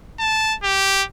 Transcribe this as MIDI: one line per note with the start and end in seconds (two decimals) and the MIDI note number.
0.19 0.55 81
0.63 1.04 67